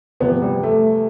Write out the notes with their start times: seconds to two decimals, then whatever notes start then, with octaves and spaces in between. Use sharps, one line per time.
0.20 E2 C3 F3 B3
0.42 G3
0.63 A3